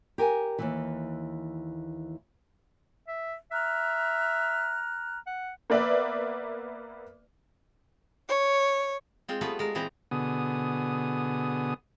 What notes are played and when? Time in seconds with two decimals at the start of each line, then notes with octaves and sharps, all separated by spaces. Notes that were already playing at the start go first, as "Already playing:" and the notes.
0.18 G4 A#4 G#5
0.59 D#2 G#2 E3
3.08 E5
3.51 E5 A#5 F6 F#6
5.27 F#5
5.70 A#3 B3 B4 D5 E5
8.29 C#5
9.28 G#3 C4 F4
9.41 G3 A3 B3 F4 G#4 B4
9.59 G#3 A#4
9.75 A#2 E3 C4 G#4 B4 A#5
10.11 B2 D3 B3 G#4 D#6